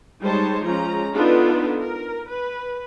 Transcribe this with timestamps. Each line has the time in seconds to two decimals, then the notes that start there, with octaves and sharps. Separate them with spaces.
0.22 G3 G#3 D#4 C5 C#5 A5
0.63 F3 G#3 C#4 A#5
1.14 B3 D4 D#4 F4 A4 B4
1.79 A#4
2.30 B4